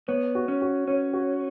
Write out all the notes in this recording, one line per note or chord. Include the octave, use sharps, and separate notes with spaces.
B3 C#5
F#4
C#4
F#4
C#4 C#5
F#4